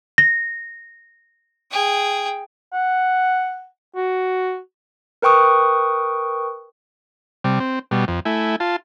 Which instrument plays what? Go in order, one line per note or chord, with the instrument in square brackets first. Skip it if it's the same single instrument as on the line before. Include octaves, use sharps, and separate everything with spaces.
[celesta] A#6
[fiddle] G#4 G5
[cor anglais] F#5
F#4
[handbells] A#4 B4 G5 C#6 D#6
[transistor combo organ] C3 G3
C4
B2 G3
F2
A3 E4 G#5
F4 A5